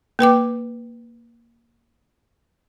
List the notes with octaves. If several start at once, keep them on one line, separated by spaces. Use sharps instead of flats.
A#3 B4 G5 D6